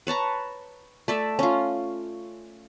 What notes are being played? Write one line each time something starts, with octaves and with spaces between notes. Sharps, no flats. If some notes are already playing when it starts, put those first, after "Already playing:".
B4 C#5 A5 A#5
A3 D5 E5
C#4 F4